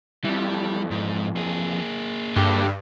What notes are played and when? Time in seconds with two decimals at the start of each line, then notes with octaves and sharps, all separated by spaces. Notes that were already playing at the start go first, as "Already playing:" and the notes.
0.25 F2 E3 G3
0.91 G#2
1.36 A#3 G#4
2.36 G2 D3 G4